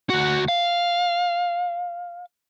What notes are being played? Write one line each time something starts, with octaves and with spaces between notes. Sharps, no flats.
D2 F#4
F5